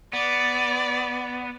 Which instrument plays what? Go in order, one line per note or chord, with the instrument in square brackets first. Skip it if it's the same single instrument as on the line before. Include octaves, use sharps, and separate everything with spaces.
[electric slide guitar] B3 [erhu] D5